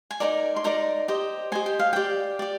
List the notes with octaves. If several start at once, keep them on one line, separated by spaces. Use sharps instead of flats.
G#5
D#4 A#4 D5 A#5
C6
D#4 A#4 D5 A#5
G4 C5 D#5
G4 C5 D#5 G#5
G5
F5
G4 D5 G5
G4 D5